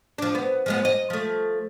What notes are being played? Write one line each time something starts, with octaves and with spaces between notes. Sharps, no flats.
F3 D4
B3
F3 G#3 B3
D#5
F3 A3